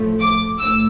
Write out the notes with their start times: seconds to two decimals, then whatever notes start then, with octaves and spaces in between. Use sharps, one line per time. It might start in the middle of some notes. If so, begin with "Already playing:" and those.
Already playing: A2 F3 A3
0.21 D6
0.58 A2 E6